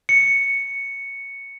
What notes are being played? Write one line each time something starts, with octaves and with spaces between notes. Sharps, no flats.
C#7